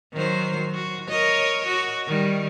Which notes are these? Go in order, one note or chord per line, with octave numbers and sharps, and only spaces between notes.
D#3 F#3 C5
F#4
A#4 C#5 D#5
F#4
D#3 G3